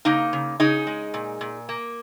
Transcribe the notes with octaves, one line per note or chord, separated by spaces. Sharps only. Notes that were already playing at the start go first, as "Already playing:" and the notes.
C#3 A#3 D#4
C#3
C#3 D#4 G#4
G#3
A#2
A#2
A#3